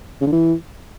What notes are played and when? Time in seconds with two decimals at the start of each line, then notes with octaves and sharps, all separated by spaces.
0.21 C#3
0.27 D3
0.32 E3